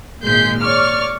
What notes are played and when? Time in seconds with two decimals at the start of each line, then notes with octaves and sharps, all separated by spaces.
0.22 G#1 A#2 G#3 G6 B6 C7
0.62 C#5 D5 C#6 D6 F6